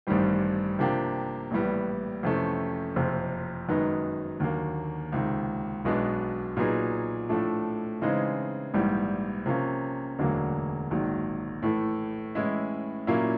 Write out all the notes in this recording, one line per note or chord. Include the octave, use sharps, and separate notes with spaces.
A1 G2 D#3 G3 C4
C3 F3 A#3 D4 G4
A#1 A2 E3 G3 B3
F2 C3 E3 A3 C#4
F#1 F2 C3
F#2 D#3 G#3 B3 D#4
D#2 D3 F#3 A#3
C#2 C3 D#3
B1 B2 G#3 B3 D4
A#2 F#3 B3 D#4 G#4
A2 F3 A3 D4
C#3 E3 G#3 C4 D#4
A#1 G#2 E3 G3
C3 F3 A#3 C#4
E1 D2 D3 F#3 A#3
A#1 G#2 D#3 F#3
A2 E3 A3
A2 E3 G#3 C#4 E4
A#2 F#3 A#3 C#4 E4